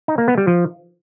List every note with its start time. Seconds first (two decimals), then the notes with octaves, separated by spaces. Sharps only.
0.08 D#4
0.18 A#3
0.28 B3
0.38 G3
0.47 F3